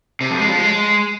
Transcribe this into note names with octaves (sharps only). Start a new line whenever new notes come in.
C3
F2
G#3
F3
G#3